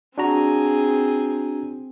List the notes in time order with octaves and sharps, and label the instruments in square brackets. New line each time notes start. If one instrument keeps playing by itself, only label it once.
[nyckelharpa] C4 G#4 [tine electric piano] D4 F#4 A#5